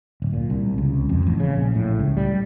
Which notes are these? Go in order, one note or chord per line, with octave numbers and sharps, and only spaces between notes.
D1
A#2
C2
C#2
F2
A1
C#3
A#1
A2
C#2
G3